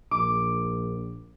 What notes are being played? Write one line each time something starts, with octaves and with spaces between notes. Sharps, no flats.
A#1 D6